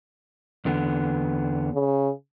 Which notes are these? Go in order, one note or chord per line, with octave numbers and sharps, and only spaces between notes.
E2 D3 B3
C#3